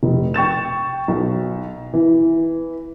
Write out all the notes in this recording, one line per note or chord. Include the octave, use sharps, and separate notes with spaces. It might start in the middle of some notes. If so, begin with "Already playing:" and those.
F1
G5 C#6 A6 E7
B1
E3